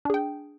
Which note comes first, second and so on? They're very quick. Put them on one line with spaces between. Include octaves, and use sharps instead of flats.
D4 G#4 G5